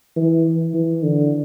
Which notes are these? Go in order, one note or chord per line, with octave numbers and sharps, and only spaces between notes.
E3
E3
D3